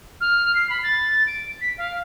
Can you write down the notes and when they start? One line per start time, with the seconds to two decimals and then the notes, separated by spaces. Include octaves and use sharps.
0.21 F6
0.55 C7
0.70 B5
0.83 A6
1.27 D7
1.61 B6
1.78 F5